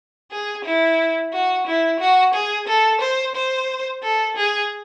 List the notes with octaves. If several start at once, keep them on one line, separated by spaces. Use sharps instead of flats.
G#4
E4
F#4
E4
F#4
G#4
A4
C5
C5
A4
G#4